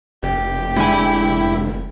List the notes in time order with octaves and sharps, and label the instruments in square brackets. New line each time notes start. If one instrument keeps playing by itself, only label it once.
[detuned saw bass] F1 [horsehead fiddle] G4
[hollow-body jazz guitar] G#2 D3 G#5 [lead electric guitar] E4 B5